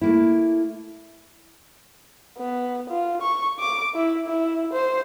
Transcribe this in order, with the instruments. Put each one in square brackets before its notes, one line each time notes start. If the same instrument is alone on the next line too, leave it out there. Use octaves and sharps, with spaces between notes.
[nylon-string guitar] A3 A#3 E4
[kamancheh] B3
F4
C#6
D6
E4
E4
C5